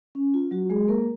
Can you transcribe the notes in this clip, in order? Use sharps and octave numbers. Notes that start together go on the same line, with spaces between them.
C#4
F4
F#3 F#4
G#3 G#4
A#3 A#4